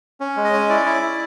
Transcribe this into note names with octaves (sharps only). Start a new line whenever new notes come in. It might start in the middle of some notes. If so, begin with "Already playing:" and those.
C#4
G#3
D#5
C#4
E4 D5
E4
E4